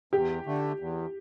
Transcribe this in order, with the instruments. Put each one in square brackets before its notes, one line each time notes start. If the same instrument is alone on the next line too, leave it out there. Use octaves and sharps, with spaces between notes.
[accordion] E2 [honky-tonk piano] G4
[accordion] D3 A3
E2